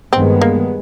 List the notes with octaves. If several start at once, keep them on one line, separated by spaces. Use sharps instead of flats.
G2 D#3 G#3 B3 C4
A#3